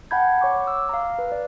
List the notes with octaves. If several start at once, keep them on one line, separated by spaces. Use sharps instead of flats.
F#5 G5 A5 B5 G6 G#6
C#5 C#6 D6
D6 E6
F5 A#5
B4
D5